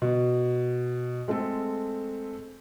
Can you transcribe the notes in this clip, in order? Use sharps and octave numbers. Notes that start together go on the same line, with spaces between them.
B2
G#3 A3 C4 A4